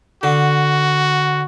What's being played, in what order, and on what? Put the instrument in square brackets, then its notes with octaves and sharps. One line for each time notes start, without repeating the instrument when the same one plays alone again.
[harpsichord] D3 [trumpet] F#4